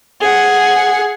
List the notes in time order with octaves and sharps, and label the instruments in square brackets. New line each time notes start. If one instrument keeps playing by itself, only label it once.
[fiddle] G#4 F#5